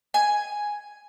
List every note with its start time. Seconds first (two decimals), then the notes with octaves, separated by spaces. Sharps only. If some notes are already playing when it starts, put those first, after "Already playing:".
0.14 G#5